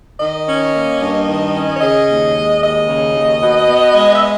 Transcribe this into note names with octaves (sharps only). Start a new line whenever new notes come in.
D#3 D#5
C#4
A#3
G2
D#3
C#4
C#5
C#3 D#5
D#2
G#3
D#2 D#5
C#3
D#2
B2
B3
G#3
E5
D#5